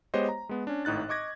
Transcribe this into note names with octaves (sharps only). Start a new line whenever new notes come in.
G#3 B3 G4 C5 C#5 D#5
A#5
G#3 B3
C#4 D4
G#1 A2 D#4 F#6 A6
D#5 C#6 D6 G#6 A#6